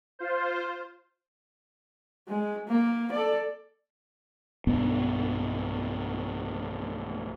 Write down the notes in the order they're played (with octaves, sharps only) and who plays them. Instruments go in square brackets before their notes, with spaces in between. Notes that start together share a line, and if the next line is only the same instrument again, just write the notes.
[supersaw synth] F4 C5
[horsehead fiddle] G#3
A#3
A4 D5
[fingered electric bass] B1 G2 B3 C#4